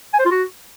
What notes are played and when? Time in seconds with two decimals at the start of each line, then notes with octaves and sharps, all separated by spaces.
0.13 G#5
0.19 C5
0.25 F4
0.31 F#4